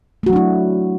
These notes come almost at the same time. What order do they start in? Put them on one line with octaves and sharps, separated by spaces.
A3 F#4 F#3 D4 E4